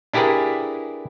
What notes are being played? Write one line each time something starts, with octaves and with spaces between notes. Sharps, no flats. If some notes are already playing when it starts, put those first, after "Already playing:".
D4 E4 G4 G#4 A#4 B4